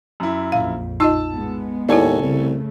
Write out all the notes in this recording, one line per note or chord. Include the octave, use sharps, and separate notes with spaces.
F#2 E4
A#1 F2 F5
D#4 F4 D#5 A5 E6
A2 G#3 B3
D#2 E4 A4 B4 C#5 D5 G#5
C2 C#3 A3